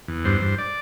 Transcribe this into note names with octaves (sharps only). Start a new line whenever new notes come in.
E2
G2 C5
G2
D5